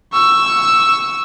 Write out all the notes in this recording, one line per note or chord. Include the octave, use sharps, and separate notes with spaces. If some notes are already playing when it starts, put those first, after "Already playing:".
C#6 E6